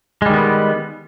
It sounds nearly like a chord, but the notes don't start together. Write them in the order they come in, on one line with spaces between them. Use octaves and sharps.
G#3 G3 D#3 B3